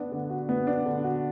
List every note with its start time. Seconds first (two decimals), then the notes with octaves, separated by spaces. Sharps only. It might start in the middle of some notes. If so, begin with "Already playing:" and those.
Already playing: B3 D4
0.12 D3
0.30 F#4
0.49 B3
0.67 D4
0.86 D3
1.04 F#4